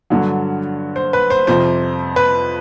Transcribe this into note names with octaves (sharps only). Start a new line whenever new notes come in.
G2 D3 F#3
C5
B4
C5
F2 C3 F3 C5
B4